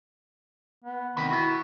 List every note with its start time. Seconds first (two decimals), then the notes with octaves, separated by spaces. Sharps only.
0.85 B3
1.17 D2 C3 D#3 B5
1.31 B3 E4 F#4